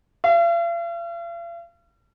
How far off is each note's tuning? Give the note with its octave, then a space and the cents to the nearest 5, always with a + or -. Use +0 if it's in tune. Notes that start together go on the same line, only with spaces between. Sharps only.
F5 -45